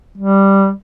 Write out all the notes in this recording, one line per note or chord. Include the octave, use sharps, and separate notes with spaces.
G3